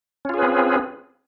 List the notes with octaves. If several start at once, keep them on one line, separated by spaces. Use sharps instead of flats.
C4 C#4 F4 G#4 B4